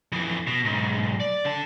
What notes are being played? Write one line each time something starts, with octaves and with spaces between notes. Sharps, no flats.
F2 E3
B2
B1 G#2
D5
D3 A5